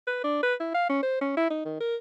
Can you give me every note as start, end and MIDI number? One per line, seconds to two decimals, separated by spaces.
0.07 0.20 71
0.24 0.40 62
0.43 0.55 71
0.60 0.73 64
0.74 0.87 77
0.89 1.02 61
1.03 1.20 72
1.21 1.37 61
1.37 1.49 64
1.50 1.60 63
1.65 1.77 51
1.80 1.96 70